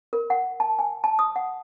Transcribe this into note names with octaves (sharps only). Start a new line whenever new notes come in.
A#4
F#5
A5
G#5
A5
D#6
F#5